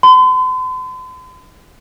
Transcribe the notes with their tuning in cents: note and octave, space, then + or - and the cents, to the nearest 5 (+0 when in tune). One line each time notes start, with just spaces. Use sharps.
C6 -45